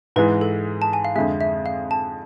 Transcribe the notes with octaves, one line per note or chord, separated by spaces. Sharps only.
G#2 E3 G#3 B4
A4
A5
G#5
F5
F2 D3 G#3 E5
E5
F5
A5